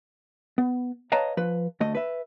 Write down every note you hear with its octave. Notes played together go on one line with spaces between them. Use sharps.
B3
B4 C#5 D#5 F5 A5 A#5
F3 B4
D2 A3 D#5
B4 E5